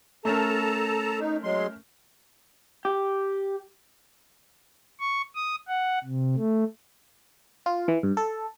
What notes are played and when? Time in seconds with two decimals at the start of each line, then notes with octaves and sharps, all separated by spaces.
0.25 A3 C#4 A4 A#4 A5 A#5
1.20 D#4
1.44 F#3 G#3 C6
2.85 G4
5.00 C#6
5.35 D#6
5.68 F#5
6.04 C3
6.36 A3
7.66 F4
7.88 E3
8.03 G2
8.17 A4